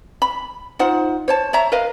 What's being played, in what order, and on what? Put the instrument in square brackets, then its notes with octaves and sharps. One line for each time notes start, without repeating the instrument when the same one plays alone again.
[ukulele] B5
D#4 F4 C5 F#5
C5 C#5 A5
C#5 E5 A#5
A#4 B4 D#5 F5